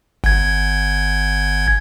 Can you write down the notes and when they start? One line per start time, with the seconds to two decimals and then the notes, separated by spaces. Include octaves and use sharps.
0.24 G1 G#6